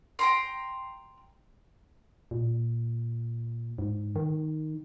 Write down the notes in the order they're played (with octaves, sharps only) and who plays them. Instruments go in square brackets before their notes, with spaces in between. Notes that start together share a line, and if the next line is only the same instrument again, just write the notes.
[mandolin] G5 A#5 C6
[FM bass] A#2
G#2
D#3